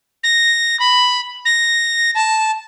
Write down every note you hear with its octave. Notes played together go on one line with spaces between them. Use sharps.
A#6
B5
A#6
A5